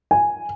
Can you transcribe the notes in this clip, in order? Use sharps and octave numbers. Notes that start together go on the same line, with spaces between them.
G#5